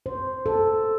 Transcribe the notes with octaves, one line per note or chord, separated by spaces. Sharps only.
C5
A4